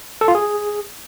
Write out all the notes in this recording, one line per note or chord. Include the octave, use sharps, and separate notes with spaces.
A4
F4
G#4